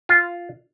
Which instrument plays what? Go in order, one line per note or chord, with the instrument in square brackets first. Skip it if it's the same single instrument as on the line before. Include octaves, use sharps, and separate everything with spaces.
[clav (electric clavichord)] F4